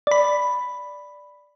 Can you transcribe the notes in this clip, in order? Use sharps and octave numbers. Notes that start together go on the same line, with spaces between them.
D5 B5